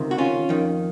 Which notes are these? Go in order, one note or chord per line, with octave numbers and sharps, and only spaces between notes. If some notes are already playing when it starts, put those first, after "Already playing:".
Already playing: C#2 C3 D#3
F#4
C#4 F4
F2 D#3